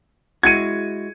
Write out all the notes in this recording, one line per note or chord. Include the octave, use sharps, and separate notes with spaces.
G#3 E4 F#4 G#6 C#7 D#7